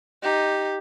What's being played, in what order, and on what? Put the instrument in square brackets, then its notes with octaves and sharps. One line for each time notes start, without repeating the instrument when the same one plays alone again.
[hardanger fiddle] D#4 [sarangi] G4